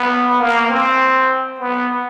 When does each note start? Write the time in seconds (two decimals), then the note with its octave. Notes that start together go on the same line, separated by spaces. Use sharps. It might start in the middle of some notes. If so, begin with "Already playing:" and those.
Already playing: B3
0.40 A#3
0.70 C4
1.59 B3